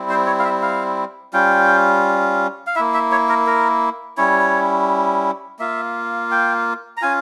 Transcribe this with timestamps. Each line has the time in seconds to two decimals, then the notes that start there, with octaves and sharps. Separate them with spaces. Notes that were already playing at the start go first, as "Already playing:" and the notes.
Already playing: G3 C4 E4
0.09 C5
0.27 C#5
0.39 F5
0.45 E5
0.62 F5
1.33 G3 C#4 F4 G5
2.67 F5
2.76 A#3 E4 E5
2.94 E5
3.11 C#5
3.29 A#4
3.47 A#4
4.18 G3 C#4 E4 C#5
5.59 A#3 F4 E5
6.31 G5
6.97 A#5
7.02 C#4 F4 G#5